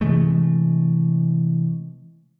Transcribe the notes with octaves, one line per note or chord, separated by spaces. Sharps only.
C3 E3 G#3 A3